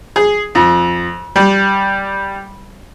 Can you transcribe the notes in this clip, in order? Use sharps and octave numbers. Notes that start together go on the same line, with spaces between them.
G#4
F2
G3